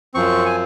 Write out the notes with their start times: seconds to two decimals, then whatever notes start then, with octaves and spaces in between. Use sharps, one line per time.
0.14 F#2 F3 C4 C#6
0.46 G#5